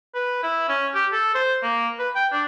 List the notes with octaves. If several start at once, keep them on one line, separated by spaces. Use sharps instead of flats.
B4
E4
C#4
G4
A4
C5
A#3
B4
G5
D4